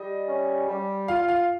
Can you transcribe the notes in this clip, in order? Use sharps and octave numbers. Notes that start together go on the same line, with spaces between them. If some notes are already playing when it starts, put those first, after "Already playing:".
Already playing: G3 D#5
C#4
G3
F4 F5
F5